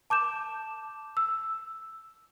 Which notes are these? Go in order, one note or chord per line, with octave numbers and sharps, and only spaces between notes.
A5 D6 G6 E7
E6